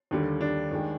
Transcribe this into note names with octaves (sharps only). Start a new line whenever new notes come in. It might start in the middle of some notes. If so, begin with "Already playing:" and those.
D#2 D3 G3
D4
D#2 D#3 G#3